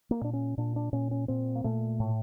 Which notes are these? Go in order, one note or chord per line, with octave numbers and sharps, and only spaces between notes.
A#3
A#2 D4
C#4
A#2 D4
D4
A#2 C#4
C#4
A#2 C4
A#3
A#2 A3
A2